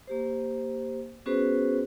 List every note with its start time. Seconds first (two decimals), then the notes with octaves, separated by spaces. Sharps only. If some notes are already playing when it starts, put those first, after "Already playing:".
0.07 A#3 G4 C5
1.26 B3 C#4 F#4 G#4 B4 C5